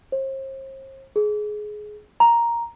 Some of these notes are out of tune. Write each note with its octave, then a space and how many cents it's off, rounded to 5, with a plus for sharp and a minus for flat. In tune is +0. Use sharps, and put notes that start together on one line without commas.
C5 +40
G#4 +20
A#5 +5